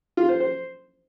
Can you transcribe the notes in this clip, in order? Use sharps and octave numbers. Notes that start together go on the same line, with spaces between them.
F4
C5
C5